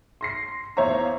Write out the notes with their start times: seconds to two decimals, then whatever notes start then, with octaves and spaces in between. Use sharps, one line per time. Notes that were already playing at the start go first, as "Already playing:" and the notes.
0.21 C6 A#6 C7
0.77 E2 C5 C#5 E5 F5 A#5